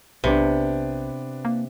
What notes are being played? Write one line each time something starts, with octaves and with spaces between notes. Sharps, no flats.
B1 C3 B3 D4
A#3